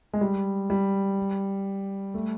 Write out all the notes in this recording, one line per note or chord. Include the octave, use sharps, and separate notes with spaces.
G#3
G3
G3
A3